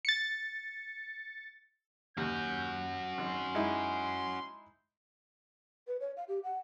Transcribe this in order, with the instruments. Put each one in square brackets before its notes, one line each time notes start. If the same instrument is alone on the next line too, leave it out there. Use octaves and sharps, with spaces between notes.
[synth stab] A6 C#7
[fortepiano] D#2 [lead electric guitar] C#4 F#4 [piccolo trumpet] G6
[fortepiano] G#1 [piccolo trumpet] C6
[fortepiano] G#3 D#4 E4
[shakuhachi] B4
C#5
F5
G4
F#5